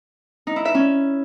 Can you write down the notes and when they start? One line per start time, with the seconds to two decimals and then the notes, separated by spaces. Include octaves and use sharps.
0.47 D#4
0.56 E4
0.65 E5
0.75 C#4